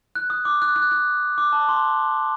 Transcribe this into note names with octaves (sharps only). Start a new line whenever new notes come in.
F#6
D#6
D6
F#6
F#6
F#6
D6
A5
C6